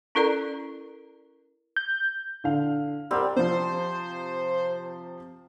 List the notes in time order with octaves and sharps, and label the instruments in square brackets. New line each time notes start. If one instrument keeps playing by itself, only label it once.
[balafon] C#4 E4 A4 A#4 D5 A#5
[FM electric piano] G6
[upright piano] D3 F5
[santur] G3 C4 [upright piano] A#4 D5 F#5
[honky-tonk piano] C3 F3 [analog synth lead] C5